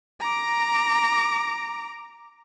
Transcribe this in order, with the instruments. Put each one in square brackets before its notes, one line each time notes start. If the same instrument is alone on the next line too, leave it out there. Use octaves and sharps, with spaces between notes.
[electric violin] A#5 D6